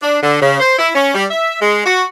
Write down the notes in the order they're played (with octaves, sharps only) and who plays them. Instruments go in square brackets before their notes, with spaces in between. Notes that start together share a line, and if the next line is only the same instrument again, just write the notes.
[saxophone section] D4
D3
C#3
C5
E4
C#4
G3
E5
G#3
F#4